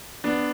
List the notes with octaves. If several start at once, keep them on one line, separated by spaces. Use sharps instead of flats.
B3 D4